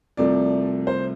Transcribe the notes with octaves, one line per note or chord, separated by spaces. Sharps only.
C2 C3 F3 A3 D5
C5